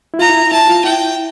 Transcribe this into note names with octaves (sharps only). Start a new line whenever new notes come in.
E4
F4 A#5
E4
E4 A5
F4
E4 G5